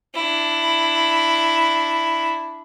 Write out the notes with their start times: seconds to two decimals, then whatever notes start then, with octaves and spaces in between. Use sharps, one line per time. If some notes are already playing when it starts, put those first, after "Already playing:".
0.14 D4 E4